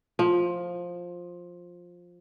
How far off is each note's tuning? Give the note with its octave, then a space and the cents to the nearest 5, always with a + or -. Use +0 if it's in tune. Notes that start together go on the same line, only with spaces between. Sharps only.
F3 +10